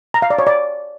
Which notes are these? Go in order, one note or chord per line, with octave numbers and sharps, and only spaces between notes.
A#5
F5
D5
C#5
D5